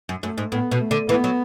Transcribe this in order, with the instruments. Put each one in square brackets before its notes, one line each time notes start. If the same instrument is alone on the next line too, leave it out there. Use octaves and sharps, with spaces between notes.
[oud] F#2
[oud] F#2 [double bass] A3
[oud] G#2
[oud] A2 [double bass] B3
[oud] B2
[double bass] A3
[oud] D3
[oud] E3 [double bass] B3
[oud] F#3